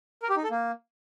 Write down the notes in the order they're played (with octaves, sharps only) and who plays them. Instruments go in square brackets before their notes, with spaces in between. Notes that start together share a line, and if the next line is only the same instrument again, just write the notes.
[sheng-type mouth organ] A#4
G4
D#4
A4
A#3